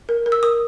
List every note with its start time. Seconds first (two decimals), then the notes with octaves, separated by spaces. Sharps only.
0.09 A#4
0.26 A#4
0.32 E6
0.43 A#4 D#6